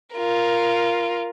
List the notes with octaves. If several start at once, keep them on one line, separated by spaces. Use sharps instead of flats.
F4 A#4